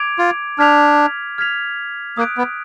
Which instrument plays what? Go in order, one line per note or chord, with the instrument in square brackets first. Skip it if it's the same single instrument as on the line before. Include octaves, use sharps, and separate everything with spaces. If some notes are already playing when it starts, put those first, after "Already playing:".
Already playing: [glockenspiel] D6 G#6 D7 F7
[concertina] F4
[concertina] D4 [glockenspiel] F6 G#6 B6 F7
[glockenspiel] F6 G#6 B6 F7
[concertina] A#3 [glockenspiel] D#6 F#6 D7
[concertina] B3